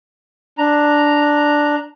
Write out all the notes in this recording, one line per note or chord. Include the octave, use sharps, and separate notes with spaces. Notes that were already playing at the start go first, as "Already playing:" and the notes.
D4 A#5